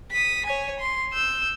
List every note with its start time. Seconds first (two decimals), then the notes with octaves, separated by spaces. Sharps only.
0.12 D#6 B6
0.46 C#5 G#5
0.80 C6
1.13 E6 G6